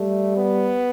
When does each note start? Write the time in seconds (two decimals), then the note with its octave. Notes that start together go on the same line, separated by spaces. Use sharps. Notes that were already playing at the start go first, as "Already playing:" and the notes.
Already playing: G3 A3
0.37 B3